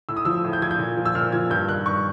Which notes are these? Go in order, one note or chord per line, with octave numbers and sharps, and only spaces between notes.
A2 E6
D#6
F3 E6
A2
G6
F3 G#6
G6
A#2
F3
E6
A#2 F6
F3 G#6
G2 G6
D#3 F#6
G2 C#6